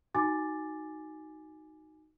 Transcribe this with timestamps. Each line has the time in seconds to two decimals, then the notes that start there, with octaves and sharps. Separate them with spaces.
0.14 D#4 F#4 G#5 D6 A6